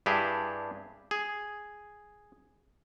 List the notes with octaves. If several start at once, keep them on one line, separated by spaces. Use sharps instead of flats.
G2 D4 E4 G4 G#4
G#4